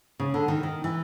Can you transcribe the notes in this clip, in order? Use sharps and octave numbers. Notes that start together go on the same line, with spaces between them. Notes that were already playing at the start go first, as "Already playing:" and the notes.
C#3
D3
D#3
D#3
E3